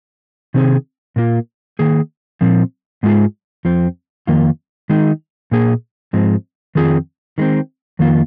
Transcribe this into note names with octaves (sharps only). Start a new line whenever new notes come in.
C3 D#3 C4 G#4
A#2 A#3 F4
D#3 A#3 G#4
A#2 F3 C4
G#2 G#3 F4 G#4
F2 F3 C4
F2 D#3 A#3 F4
D#3 G#3 D#4
A#2 A#3 G#4
G#2 F3 G#3 C4
F2 D#3 C4 F4 G#4
D#3 G#3 C4
F2 D#3 A#3 F4